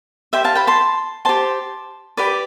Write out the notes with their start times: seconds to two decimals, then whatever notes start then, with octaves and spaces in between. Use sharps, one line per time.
0.33 G4 C5 E5 G5
0.44 F5 A5
0.55 G5 B5
0.67 A5 C6
1.25 G4 C5 A5 C6
2.17 G4 B4 D5